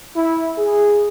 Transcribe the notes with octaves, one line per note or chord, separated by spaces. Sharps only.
E4
G#4